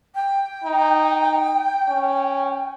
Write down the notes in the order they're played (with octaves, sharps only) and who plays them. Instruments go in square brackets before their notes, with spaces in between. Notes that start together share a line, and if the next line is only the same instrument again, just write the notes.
[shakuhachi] G5
[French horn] D#4
C#4